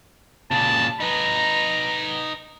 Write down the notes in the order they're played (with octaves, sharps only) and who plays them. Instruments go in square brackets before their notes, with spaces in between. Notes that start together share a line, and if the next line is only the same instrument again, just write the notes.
[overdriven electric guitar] A#2 C#3 [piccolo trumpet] A5
[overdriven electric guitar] D#4 B4 [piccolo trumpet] A#5